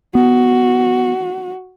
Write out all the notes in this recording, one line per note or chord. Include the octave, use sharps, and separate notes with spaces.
B3 F#4